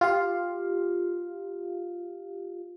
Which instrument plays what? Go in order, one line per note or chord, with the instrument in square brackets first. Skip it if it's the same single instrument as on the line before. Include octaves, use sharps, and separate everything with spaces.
[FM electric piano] F4 G4 F5